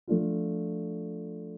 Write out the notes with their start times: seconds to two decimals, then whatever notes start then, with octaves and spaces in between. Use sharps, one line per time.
0.08 F3 A3 D4 F4